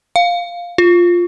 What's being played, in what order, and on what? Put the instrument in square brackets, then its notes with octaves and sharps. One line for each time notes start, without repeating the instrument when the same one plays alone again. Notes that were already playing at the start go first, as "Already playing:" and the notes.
[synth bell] F5
F4